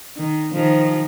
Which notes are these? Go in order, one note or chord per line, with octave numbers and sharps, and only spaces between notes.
D#3
D#3 F3